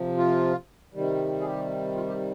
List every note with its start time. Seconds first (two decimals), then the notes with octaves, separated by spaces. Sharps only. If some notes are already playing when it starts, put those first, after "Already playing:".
Already playing: C3 F3
0.17 F4
0.94 C3 D#3 G3
1.41 G#4
1.45 G4
1.96 F4
2.08 G4